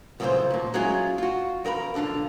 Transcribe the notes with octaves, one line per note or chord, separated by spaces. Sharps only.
C2 F#2 C#3 E3 F4 C5
D#2 A#2
F#3 G#3 C#4 E4 F4 G#4
F4 F#4
E2 A#4 F5 B5
B1 D3 D4 F4 F5